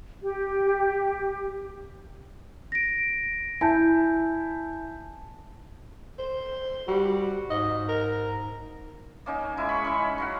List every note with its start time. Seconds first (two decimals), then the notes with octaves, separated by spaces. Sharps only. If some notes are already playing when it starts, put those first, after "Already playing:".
0.21 G4
2.72 A#6 D7
3.61 E4 G#5 A5 G6
6.18 C5
6.88 G3 F#4
7.50 G#2 D#5
7.88 A#4
9.26 A#3 C#4 D#4
9.57 G#3 E4
9.69 B5 C#6
9.84 C#4 E5 B5
9.99 D#4
10.18 F#3 F5 F#5